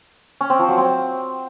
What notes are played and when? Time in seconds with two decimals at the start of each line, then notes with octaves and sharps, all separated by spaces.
0.41 C#4
0.50 C4
0.59 F3
0.69 F#3
0.78 C4